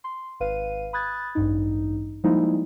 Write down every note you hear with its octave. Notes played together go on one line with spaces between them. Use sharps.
C6
G#1 B4 F5 D#7
B5 D#6 F#6 G#6 A6
A1 G2 D#4
F3 G3 G#3 A#3 D#4 E4